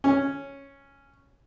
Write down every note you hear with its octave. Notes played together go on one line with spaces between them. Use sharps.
C#4